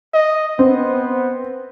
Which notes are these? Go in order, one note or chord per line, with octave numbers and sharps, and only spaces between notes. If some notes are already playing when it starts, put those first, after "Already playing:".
D#5
B3 C4